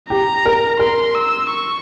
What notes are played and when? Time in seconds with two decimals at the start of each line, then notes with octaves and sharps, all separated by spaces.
0.10 G4 A#5
0.46 A#4
0.79 A#4 C6
1.15 E6
1.50 C#6